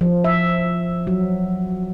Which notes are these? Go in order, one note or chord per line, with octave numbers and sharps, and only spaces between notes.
F3
E5
F#3